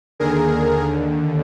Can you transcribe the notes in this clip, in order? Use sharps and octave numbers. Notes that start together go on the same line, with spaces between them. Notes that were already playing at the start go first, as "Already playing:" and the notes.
D#2 D3 G#4 A#4